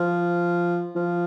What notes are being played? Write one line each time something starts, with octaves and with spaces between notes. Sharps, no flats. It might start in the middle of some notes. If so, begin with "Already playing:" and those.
Already playing: F3
F3